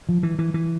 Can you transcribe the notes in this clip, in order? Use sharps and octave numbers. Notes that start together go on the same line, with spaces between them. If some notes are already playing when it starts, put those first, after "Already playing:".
F3
E3
E3
E3